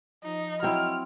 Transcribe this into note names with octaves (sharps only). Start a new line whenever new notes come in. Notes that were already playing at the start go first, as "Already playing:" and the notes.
F3 D#4 D#5
F#3 C4 E4 F6